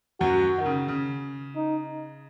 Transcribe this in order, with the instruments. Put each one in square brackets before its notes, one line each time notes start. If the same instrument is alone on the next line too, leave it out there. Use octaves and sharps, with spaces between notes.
[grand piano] F#2 F#3 [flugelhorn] F#4
[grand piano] D#3
C#3
C#3
[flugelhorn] D#4